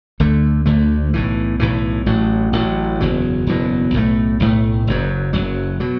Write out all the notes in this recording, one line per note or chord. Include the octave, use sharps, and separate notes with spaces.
D2 D3 A3
D2 D3 A3
B1 A2 E3
B1 A2 E3
A1 A2 F#3
A1 A2 F#3
F#1 E2 B2 F#3
F#1 E2 B2 F#3
B1 A2 E3 A3
B1 A2 E3 A3
F#1 F#2 F#3
F#1 F#2 F#3
B2 F#3